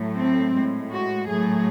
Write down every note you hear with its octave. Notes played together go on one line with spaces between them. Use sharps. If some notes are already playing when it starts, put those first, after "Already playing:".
Already playing: A2 F#3 A3
C4
A2 G#3
F#4
A2 F#3 A3 G#4